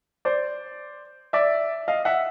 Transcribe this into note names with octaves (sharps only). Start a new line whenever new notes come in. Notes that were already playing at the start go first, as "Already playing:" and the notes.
C5 D5
D5 E5
D#5 F5
E5 F#5